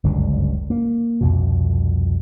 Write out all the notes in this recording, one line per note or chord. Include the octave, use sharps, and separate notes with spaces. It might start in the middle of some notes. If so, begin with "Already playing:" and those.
G1 C#2 F#2 D3
A#3
C2 F2 B2